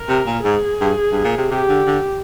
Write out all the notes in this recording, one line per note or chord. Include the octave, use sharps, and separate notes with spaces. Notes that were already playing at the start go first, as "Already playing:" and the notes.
Already playing: A#4
C3
A#2
G#2 G#4
G2
G2
A#2
C3
C3 G4
D3
D3